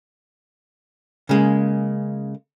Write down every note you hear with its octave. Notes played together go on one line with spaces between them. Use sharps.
C#3 G#3 A#3